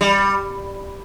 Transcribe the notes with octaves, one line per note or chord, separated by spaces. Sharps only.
G3